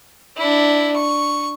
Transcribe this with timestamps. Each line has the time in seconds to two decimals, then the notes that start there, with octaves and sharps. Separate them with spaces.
0.37 D4 E4
0.95 C#6